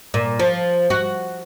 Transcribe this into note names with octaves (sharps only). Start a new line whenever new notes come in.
A#2
F3
F#4